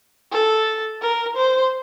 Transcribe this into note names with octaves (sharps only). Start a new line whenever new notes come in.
A4
A#4
C5